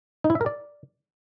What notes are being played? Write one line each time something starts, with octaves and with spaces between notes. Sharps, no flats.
D#4
E4
E5
A#4
D5